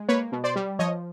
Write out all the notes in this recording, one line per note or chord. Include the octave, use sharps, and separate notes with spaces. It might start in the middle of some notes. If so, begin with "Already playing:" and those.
Already playing: G#3
A#3 B4 C#5
B2
C5 D5
G3
F3 C#5 D#5